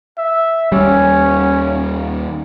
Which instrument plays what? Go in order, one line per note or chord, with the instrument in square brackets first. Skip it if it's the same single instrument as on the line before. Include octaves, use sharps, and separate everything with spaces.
[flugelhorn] E5
[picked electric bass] D#2 G3 [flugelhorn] C#4